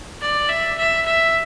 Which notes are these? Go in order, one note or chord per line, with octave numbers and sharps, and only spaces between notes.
D5
E5
E5
E5